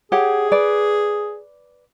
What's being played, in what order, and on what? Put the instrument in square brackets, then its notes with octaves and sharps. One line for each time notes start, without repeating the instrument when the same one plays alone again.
[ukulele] G4 C#5 F#5 [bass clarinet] G#4
[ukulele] B4 D5